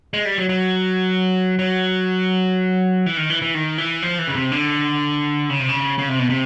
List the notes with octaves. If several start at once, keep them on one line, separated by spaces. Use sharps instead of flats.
G#3
G3
F#3
F#3
F#3
E3
D#3
E3
E3
D#3
E3
F3
E3
C#3
C3
D3
C#3
C3
C#3
C#3
C3
B2
C3